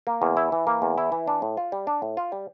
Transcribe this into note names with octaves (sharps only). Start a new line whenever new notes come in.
A#3
E2
E4
E3
A#3
E2
E4
E3
D4
A2
F4
G3
D4
A2
F4
G3